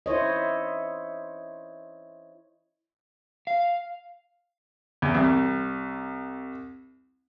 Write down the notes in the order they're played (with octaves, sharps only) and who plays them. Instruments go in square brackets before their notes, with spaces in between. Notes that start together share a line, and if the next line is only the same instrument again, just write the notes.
[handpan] E4 C5 C#5 D#5
[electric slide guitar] F5
[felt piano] E2
C2